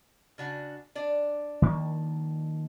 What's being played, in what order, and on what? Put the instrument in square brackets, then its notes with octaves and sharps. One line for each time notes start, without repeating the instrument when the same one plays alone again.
[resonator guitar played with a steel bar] C#3 D4 F#4
D4 D5
[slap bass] D#3 F3 A#3